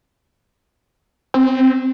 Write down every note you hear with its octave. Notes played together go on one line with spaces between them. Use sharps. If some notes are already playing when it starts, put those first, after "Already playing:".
C4